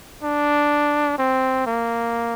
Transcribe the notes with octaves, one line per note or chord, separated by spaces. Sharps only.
D4
C4
A#3